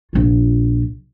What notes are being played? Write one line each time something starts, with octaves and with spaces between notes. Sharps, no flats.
A#1 F4